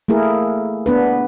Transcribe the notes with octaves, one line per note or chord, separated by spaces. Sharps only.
A3 A#3 E4 G#4 A#4
B3 D4 B4